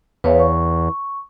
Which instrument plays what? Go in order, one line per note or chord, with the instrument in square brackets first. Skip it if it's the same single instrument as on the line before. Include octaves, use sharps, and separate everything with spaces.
[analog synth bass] E2 [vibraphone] B4 C#5 F5
[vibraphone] C#6